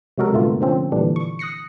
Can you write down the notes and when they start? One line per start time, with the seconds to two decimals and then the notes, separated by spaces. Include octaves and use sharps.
0.18 C3 F#3 G#3 F#4 A4 A#4
0.33 G2 A#2 D3 A3 B3 F4
0.61 D3 F3 C4 C#4
0.92 A#2 D3 E3 G3 D4
1.16 C#6
1.39 D#6 F#6 A#6 C7 C#7